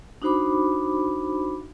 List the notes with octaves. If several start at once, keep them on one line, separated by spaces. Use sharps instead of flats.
D4 D#4 F#4 C5 B5 D6